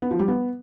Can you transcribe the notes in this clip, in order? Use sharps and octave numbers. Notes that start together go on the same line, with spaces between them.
B3
F3
G3
B3